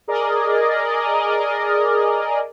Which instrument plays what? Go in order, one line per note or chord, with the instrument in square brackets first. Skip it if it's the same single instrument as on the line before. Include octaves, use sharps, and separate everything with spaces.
[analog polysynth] G#4 A#4 D5 D#5